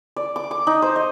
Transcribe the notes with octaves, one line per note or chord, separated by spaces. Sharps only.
D5
D6
D6
D#4
C5
D#5